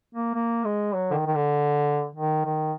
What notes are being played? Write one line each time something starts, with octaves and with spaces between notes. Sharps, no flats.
A#3
A#3
G#3
F#3
D3
D#3
D#3
D3
D#3
D#3